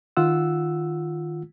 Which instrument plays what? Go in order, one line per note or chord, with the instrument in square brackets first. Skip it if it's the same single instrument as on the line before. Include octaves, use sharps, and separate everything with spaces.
[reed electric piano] D#3 F4 F#5 E6